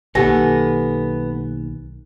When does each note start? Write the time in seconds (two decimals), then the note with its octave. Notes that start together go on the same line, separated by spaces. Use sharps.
0.15 B1 D#3 A#3 B3 G4 A4 G#5 A#6